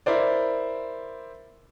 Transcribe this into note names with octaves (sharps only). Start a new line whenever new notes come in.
E4 A#4 C5 D5